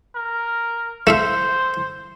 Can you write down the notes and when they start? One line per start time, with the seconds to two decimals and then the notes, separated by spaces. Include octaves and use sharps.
0.15 A#4
1.07 A3 C5 E5 F5